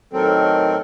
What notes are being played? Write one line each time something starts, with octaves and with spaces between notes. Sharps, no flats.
A2 D#3 F#3 C4 A4 A#4